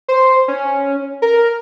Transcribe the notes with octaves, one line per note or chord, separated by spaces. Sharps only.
C5
C#4
A#4